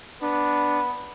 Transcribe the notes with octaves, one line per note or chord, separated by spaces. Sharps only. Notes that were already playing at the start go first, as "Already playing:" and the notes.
B3 D4